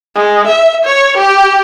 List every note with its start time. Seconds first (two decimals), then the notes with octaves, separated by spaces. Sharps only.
0.15 G#3
0.47 E5
0.85 C#5
1.17 G4